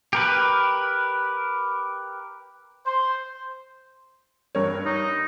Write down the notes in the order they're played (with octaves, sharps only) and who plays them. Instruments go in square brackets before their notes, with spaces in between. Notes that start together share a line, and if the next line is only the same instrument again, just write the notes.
[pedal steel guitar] G4 A#4 B4
[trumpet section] C5
[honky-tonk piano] G2 A#4 C#5
[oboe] D#4